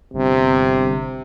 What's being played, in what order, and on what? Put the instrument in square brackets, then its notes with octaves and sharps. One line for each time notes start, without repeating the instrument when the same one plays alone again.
[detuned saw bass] G1 [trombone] C3